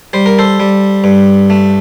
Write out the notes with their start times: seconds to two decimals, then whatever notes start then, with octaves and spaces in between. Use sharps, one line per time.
0.13 G3 C5
0.26 A#4
0.39 A4 C5
0.60 G3
1.04 G2
1.50 A3